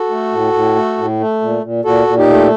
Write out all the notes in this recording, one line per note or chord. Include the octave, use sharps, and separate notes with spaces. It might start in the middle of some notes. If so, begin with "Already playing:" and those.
Already playing: F#4 A4
A3
A2
A2
A3
A2
A3
A#2
A#2
A#2 F#4 A4
A#2
D#4 G4
A3